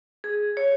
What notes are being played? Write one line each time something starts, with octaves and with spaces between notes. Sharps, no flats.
G#4
C#5